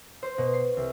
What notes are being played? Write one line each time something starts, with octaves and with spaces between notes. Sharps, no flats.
C5
B2
C7
C2